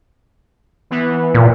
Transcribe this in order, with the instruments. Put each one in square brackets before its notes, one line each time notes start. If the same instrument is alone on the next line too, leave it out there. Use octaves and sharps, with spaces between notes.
[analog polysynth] E3 B3
[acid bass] A#2